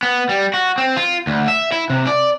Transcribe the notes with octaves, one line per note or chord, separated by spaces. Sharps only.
B3
G3
F#4
C4
F4
D2
E5
E4
C3
D5